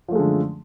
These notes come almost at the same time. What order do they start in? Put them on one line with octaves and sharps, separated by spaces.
F3 A3 G#3 D3 F#2